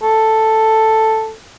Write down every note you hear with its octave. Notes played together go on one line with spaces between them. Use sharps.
A4